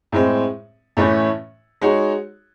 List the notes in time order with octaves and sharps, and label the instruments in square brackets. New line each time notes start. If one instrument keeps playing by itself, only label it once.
[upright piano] A2 G#3 C4
A2 E3 A3 C#4 E4
G#3 D#4 F#4 C#5